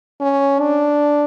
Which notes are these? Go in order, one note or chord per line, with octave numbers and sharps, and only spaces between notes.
C#4
D4